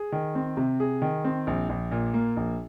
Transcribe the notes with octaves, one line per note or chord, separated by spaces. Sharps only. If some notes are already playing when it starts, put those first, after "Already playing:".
Already playing: G#4
D#3
C4
C3
G#4
D#3
C4
A#1
A#1
A#2
A#3
A#1